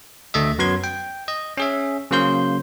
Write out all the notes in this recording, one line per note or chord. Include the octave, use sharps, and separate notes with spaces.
D2 A3 D#5 E5
F#2 F#3 B3 C6 G#6
G5
D#5
C#4 G#4 E5
C#3 F#3 A#3 C5 C6 G6